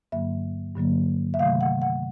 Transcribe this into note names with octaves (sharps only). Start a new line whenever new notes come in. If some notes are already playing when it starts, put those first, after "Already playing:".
G2 D3 F#3 A#3 E5
G2 D3 F#3 A#3
E5
C3 D#3 F#3 A3 F5
F#5
F#5